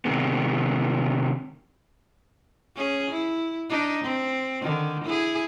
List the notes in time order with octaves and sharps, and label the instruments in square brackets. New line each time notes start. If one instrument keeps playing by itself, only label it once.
[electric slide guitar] C3 D#3 G#3 B3
[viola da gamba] C#4 G#4
E4
D4 D#4
C4
D3 D#3
E4 G#4